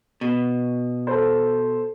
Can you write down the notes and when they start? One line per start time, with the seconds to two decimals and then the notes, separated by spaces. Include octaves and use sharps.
0.21 B2
1.07 A4 C5